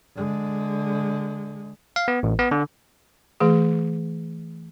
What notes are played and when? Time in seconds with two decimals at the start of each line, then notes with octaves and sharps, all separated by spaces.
0.15 D3 G#3
1.96 F5
2.08 B3
2.23 A1
2.39 B3
2.51 D3
3.40 E3 A3 G#4